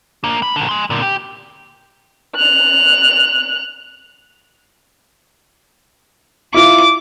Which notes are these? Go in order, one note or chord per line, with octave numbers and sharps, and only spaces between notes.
A#3 D4
B5
A#2 D3
G#5 C6
A#2 D3
G4
F#6 F7
E4 F4 D6